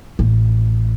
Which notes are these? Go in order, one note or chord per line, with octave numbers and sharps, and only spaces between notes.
A1